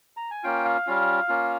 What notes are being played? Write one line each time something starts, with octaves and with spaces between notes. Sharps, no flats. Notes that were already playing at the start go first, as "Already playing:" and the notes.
A#5
G#5
A#3 C#4 F4 G5
F5
G3 C#4 F4
A#3 C#4 F4